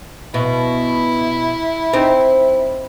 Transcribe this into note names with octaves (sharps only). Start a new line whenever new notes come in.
B2 E4
C4 D#4